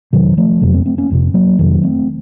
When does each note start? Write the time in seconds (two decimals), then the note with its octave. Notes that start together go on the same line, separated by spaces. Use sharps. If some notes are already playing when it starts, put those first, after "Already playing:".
0.13 F1 F2 C3 D#3 F#3
0.37 F3 A3
0.61 F1 F2 C3 F#3 A#3
0.74 A3 C4
0.86 A3 C4
0.98 A#3 C#4
1.10 F1 F2 C3
1.34 F#3 A#3
1.59 F1 F2 C3 D#3 F#3
1.83 A3 C4